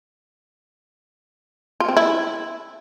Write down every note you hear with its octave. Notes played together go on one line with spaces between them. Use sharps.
F4
C4
E4